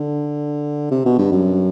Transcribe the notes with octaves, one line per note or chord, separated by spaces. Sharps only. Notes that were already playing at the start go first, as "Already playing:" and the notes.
Already playing: D3
C3
B2
G2
F#2